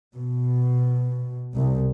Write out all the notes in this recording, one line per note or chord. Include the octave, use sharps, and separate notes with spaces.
B2
C2